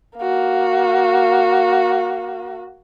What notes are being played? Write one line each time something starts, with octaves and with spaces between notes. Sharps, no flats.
A#3 F#4